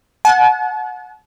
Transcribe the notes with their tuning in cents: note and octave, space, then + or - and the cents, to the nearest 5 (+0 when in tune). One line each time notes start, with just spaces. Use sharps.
F#5 -20 A5 -45